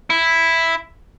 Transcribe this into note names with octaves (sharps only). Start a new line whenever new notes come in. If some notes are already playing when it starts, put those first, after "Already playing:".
E4